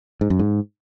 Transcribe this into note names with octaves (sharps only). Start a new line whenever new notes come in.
G#2
F#2
G#2